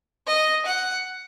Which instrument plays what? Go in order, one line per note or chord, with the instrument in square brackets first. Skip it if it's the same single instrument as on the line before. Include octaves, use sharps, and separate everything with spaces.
[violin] D#5
F#5